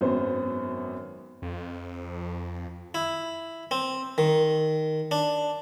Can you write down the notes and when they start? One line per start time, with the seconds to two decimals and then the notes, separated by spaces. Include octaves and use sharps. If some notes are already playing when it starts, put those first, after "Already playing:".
0.01 G#1 F#2 B3 C5
1.42 F2
2.95 E4
3.71 C4
4.18 D#3
5.11 D4